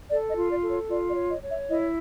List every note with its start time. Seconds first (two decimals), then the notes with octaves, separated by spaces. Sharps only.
0.10 A4 D5
0.30 D#5
0.36 F4
0.49 D5
0.62 A4
0.70 C#5
0.88 F4 D5
1.08 D5
1.15 C#5
1.29 D#5
1.42 C#5
1.48 E5
1.68 E4 D#5